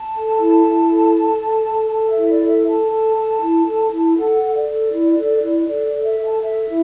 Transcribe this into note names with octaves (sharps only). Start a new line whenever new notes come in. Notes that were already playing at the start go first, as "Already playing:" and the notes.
Already playing: A5
A4
E4
E4
A4
A4
A4
A4
A4 A5
E5
E4
D5
A4
E5
A4 A5
A4
A4
E4
A4
E4
A4 F#5
A4
D5
A4
E4
A4
E4
A4 D5
D5
A4
E5
A4
A5
A4 E5
E4